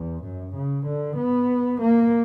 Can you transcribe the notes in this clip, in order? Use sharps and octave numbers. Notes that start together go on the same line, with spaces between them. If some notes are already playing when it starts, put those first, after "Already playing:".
Already playing: E2
F#2
C#3
D3
B3
A#3